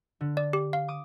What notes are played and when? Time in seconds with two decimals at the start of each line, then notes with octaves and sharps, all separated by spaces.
0.21 D3
0.37 D5
0.53 G4
0.73 F5
0.88 D6 D#6